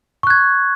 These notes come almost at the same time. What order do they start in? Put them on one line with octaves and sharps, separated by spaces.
C#6 F#6 G#6